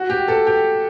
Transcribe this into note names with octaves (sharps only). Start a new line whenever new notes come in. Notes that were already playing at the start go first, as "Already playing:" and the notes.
Already playing: F#4
G4
A4
G4